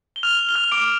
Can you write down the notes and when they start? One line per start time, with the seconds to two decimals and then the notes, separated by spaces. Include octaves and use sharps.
0.16 G7
0.23 F6 F7
0.49 G7
0.55 F6 F7
0.72 D6 D7